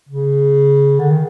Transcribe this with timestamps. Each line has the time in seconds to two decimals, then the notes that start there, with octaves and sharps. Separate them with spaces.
0.09 C#3
0.99 D3
1.10 D#3